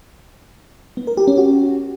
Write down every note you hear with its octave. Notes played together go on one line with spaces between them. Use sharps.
B3
A#4
G4
C#4
F#4